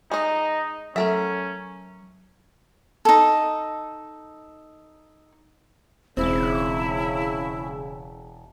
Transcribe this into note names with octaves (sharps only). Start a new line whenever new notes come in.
G#3 D#4 D#5
F#3 A3 C#4 A4 A#4 E5
D#4 A4
E1 G#2 C#3 C4 E4